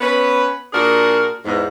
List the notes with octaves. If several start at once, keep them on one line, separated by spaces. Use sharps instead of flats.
B3 C#4 B4
A#2 D4 F#4 G#4 A#4
E2 G#2